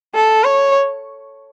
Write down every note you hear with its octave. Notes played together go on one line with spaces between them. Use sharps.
A4
C#5